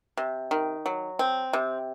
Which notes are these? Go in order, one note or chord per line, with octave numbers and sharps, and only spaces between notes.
C3
D#3
F#3
C4
C3